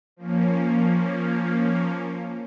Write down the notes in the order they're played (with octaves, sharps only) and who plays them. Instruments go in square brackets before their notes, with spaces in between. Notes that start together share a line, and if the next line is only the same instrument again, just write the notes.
[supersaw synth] F3 A#3 C#4